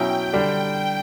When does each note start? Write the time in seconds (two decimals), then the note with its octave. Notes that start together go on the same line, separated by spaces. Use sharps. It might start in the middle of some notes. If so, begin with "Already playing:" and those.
Already playing: B2 F#3 C#4 E4 G5
0.33 D3 G3 D4